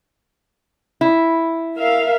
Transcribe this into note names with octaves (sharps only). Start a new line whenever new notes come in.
E4
A#4 E5 F5